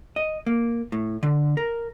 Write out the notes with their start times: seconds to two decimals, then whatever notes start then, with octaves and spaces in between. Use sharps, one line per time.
0.16 D#5
0.46 A#3
0.92 A2
1.23 D3
1.57 A#4